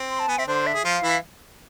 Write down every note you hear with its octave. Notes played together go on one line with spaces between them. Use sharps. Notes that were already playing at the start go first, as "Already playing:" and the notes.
Already playing: C4
C6
A5
B3 G#5
C4 E5
D3 D4 C5
E5
G#4
F3 F4 F5
E3 E4